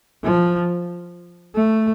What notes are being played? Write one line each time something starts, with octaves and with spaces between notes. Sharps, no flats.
F3
A3